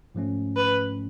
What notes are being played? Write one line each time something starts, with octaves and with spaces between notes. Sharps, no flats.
G#2 F3 A3 C#4
B4